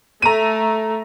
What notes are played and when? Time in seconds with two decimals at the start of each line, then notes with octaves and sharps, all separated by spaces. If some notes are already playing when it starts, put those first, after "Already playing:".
0.22 A3 A#5 D#7